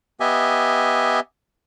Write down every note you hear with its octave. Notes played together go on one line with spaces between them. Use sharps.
B3 G4 D#5 E5 G#5